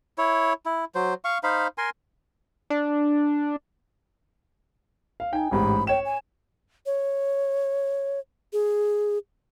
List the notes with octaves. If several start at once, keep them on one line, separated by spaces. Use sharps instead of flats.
E4 C#5
E4
F#3 C5
F5 C#6
D#4 C5 F5 B5
A#4 G#5 C6
D4
F5
D#4 G5 G#5
A1 G#2 G4 B5
C#5 G5 E7
G#5
C#5
G#4